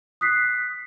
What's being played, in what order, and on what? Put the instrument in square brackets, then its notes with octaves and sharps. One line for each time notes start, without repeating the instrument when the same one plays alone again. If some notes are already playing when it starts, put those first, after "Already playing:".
[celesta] D#6 F#6 B6 C7